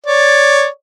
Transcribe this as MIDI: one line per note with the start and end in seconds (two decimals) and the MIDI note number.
0.06 0.66 73
0.06 0.66 74